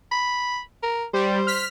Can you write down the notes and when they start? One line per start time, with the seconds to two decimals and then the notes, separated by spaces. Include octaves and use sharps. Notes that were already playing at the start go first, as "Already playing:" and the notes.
0.11 B5
0.83 A#4
1.13 G3 C5
1.47 F6 B6